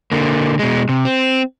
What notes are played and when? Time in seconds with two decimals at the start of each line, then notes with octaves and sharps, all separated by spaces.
0.12 D3 A#3
0.59 B2 G#3
0.89 C3
1.05 C4